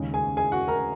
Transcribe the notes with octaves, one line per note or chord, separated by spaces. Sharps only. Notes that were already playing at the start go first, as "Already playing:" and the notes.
Already playing: D#2 C#3 G#3 C#4
G#4 G#5
G#4 G#5
F#4 F#5
A#4 A#5